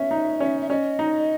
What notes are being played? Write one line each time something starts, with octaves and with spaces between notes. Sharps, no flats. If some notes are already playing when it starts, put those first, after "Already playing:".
Already playing: B3 C#4 E5
D#4
C#4
E5
C#4 D#5
D#4